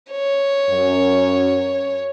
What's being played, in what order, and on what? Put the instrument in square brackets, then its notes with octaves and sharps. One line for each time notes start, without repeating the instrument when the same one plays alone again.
[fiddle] C#5
[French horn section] F#2